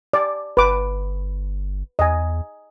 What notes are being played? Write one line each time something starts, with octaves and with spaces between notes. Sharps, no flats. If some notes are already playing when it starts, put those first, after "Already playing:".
D5
G1 B4 D6
E2 D#5 G#5